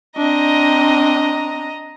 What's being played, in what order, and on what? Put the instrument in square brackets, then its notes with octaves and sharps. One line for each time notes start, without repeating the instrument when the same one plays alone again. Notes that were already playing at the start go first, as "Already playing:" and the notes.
[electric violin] C4 D4 [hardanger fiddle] D#5 A#5